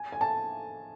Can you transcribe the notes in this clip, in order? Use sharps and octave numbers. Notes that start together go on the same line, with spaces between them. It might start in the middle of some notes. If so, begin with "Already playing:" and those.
Already playing: G#5
G#5
A5